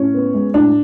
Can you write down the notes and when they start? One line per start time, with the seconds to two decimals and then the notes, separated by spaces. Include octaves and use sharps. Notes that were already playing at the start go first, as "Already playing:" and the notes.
Already playing: A2 C#4
0.14 B3
0.34 G#3
0.54 A2 D4